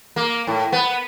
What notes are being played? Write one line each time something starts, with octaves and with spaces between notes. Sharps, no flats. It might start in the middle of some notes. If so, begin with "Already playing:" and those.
A#3
A2
B3